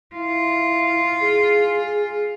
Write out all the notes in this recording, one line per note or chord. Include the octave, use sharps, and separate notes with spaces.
E4 F4
G#4